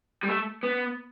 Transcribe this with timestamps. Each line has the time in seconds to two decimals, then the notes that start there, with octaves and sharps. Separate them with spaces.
0.23 G3
0.28 A3
0.63 B3